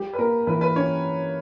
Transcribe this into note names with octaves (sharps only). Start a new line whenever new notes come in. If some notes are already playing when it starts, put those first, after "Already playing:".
Already playing: G3 G4
B4
A#3 A#4
E3 B4
B4
C#4 C#5